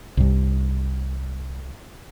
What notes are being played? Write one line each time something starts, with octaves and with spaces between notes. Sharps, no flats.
C2 G2